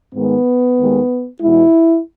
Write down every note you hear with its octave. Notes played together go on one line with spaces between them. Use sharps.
G#2 D#3 G#3 B3
D#2 D#3 G#3
E2 B2 G#3 E4